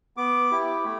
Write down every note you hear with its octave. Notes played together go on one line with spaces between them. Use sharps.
B3 D6
E4 G4
A3